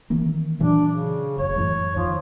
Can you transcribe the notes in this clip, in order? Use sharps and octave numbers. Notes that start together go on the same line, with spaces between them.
D#3 E3 A#3
A#2 E3 F#3 D4
C#3
F#1 C#5
F#2 A2 E3
F2 D#3 F3